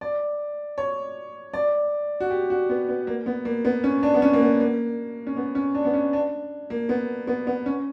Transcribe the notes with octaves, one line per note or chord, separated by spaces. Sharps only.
D5
C#5
D5
F#4
G4
F#4
B3
B3
A#3
B3
A#3
B3
C#4
D4
B3
C#4
A#3
B3
A#3
C#4
B3
C#4
D4
B3
C#4
D4
A#3
B3
B3
B3
C#4